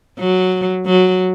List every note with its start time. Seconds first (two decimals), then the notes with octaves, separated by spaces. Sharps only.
0.19 F#3
0.86 F#3